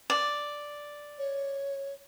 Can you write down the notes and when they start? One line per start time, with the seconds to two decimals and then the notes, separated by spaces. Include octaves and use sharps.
0.10 D5
1.18 C#5